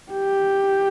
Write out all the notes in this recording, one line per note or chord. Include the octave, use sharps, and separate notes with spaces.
G4